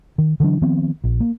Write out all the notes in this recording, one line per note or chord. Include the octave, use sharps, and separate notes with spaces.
D#3
D3 E3 F#3 D4
D#3 F3 B3 C4
A#1
A#3